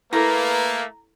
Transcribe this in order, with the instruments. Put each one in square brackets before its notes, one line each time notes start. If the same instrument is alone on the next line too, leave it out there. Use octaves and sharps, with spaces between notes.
[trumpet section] A3 A#3 [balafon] E4 A4 [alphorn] B4 [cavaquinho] A#5